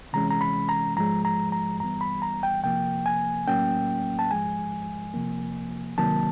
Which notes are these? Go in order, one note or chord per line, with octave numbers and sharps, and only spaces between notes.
C3 E3 G#3 C#4 A#5
A#5
B5
A#5
G#2 F3 G#3 A#5
A#5
A#5
G2 E3 G3 B3 A#5
B5
A#5
G5
C3 F3 A#3 G5
G#5
A2 F#3 A#3 C#4 G5
A5
G#2 F3 G#3 G#5
C3 F3 A#3
C2 C3 D#3 F#3 A#3 A5